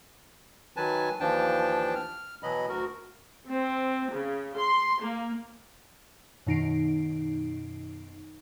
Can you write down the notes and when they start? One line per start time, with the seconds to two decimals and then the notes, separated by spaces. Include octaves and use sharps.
0.77 D#3 F#3 B4 G#5 A5
1.20 D#2 E3 F3 D4 G5 A5
1.95 F6
2.43 B2 E3 F#3 D#5 B5
2.69 D2 F#4 A#4
3.48 C4
4.12 C#3
4.58 C6
5.02 A#3
6.47 F#2 B2 D#3 D#4 C7 D7